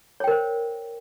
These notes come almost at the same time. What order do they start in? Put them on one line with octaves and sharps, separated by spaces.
C#5 G5 A#4 C5